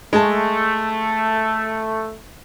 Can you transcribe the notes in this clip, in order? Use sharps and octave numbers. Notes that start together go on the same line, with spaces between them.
G#3 A3 A5